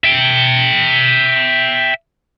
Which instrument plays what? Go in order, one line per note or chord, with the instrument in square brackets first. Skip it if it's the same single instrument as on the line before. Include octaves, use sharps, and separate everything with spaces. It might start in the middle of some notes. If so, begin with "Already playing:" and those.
[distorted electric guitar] E5 G5